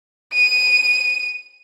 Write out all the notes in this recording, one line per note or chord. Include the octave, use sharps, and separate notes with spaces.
D#7